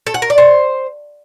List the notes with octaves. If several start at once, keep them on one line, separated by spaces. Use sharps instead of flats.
A4
F#5
A#4
D5
C5